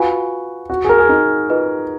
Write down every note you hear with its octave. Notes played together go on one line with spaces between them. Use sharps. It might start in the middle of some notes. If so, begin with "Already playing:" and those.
Already playing: F4 F#4 B4 F5 G#5 B5
F#4
G#4
A#4
G#4
D#4
F4 G#4 B4 D#5